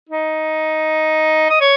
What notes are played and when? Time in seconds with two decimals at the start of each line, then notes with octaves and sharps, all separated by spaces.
0.09 D#4
1.50 D#5
1.61 C#5